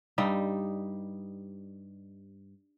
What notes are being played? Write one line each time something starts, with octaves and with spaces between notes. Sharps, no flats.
G2 G3 D#4